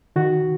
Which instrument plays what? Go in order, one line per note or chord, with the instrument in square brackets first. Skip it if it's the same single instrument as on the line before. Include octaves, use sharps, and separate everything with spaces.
[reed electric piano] D#3 F#4